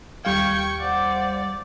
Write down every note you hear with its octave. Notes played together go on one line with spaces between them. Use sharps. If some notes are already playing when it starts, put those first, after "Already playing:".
D#2 G3 F5 G5 C#6 G#6
C5 D5 F#5